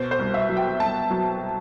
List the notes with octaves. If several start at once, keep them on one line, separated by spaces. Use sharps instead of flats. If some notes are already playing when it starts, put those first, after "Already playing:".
Already playing: B2 C5
C5
C2
E5
F#3
G5
C2 A5
F#3